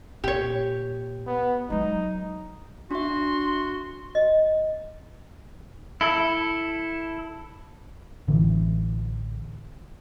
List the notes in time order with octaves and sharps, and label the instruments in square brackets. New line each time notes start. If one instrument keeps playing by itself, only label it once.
[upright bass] A#2 [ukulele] G4 C#5
[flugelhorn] B3
[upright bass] F#3 G#3 [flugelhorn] D#4
[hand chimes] D4 E5 [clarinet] F#4 [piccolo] C6
[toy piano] D#5
[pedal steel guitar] E4 A4
[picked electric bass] A1 D3 E3